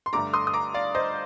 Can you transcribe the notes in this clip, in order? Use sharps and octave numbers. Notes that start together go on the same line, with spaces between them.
C6
G2 D3 A3 D4 A#5 D6
C6 D#6
D#6
A#5 D6
D5 F5
C5 D#5